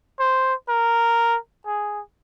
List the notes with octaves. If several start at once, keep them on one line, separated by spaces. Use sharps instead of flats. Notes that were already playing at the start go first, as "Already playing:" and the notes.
C5
A#4
G#4